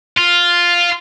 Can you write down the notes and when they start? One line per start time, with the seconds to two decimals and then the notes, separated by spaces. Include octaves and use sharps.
0.18 F4